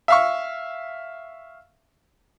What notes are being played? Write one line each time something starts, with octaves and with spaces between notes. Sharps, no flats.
E5 F5 C#6